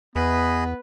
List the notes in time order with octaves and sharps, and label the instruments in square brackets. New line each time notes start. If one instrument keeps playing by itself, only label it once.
[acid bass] E2 [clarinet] B3 [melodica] G#4 D#5 B5 [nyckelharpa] B4